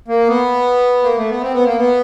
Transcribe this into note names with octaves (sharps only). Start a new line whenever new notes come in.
A#3
B3
A#3
A3
B3
C4
B3
A#3
B3